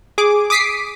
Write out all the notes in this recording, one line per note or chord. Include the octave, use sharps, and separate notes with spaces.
G#4 D6
D6 D#6 B6 C7 D7